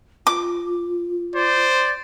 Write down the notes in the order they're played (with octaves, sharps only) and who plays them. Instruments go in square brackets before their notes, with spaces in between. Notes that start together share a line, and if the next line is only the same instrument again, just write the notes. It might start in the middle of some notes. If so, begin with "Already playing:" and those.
[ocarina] F4 [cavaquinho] D6
[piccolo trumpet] C5 [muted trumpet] D5